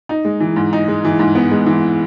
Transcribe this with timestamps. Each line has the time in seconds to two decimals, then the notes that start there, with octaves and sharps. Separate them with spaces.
0.09 D#4
0.25 G#3
0.40 E3
0.56 G#2
0.73 D#4
0.88 G#3
1.05 E3
1.19 G#2
1.35 B3
1.51 G#3
1.66 E3